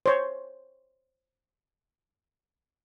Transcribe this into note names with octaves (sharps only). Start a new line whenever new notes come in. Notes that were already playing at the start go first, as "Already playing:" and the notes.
C5 C#5